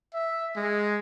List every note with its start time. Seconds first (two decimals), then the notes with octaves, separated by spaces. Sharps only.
0.14 E5
0.56 G#3